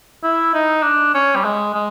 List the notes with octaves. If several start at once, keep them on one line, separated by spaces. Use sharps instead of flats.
E4
D#4
D4
C#4
G3
G#3
G#3